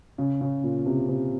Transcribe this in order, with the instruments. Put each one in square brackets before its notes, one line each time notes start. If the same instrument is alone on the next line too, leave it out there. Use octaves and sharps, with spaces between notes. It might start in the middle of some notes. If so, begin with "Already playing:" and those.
[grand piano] C#3
C#3
A#2
C3
C3